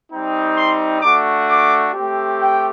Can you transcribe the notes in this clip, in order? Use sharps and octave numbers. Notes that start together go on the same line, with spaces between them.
G3 C4 D#4
C6
A3 D4 F#4 D6
D6
A3 C4 G4
G5